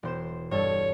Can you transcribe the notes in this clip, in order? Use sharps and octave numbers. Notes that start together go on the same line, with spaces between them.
E1 C5 E7
G2 A4 C#5